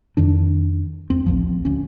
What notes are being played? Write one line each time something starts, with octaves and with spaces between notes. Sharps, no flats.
F2 D#3 D4
E2 C4
A1 D2 F3
D2 C#4